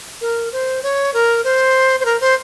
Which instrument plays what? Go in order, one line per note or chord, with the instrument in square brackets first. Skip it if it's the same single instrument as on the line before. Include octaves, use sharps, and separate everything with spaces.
[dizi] A#4
C5
C#5
A#4
C5
C5
A#4
C5